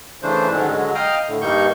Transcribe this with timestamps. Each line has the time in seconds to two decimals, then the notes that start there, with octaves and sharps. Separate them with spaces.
0.23 C#3 E3 A3 D4 C5
0.51 G#2 D3 D#3 F#3 C#4 D4
0.70 D3 F#3 G#3
0.95 D#5 F5 G5 A#5 D#6 F6
1.28 A2 D3
1.41 G2 G3 A#3 D#4 C#6 G6